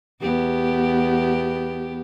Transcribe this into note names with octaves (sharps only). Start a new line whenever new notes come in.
E2 B3 G4